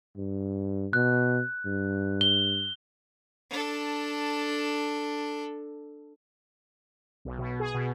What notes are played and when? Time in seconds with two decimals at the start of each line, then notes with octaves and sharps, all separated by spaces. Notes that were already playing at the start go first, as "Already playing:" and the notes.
0.17 G2
0.93 B2 F#6
1.65 G2
2.21 G7
3.50 D4 A4
7.25 B1
7.38 B2
7.60 G#4
7.74 B2